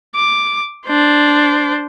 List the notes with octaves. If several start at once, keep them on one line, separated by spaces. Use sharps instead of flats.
D6
D4 C5